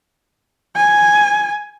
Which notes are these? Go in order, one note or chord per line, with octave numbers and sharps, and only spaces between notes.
G#5